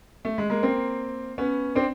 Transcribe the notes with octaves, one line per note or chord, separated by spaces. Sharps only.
A3
G#3
G#3 A#3
A#3 C4
B3 C#4
C4 D4